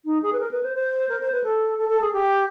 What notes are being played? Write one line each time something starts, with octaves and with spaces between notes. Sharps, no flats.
D#4
G#4
B4
A#4
B4
C5
C5
A#4
C5
B4
A4
A4
A4
G#4
G4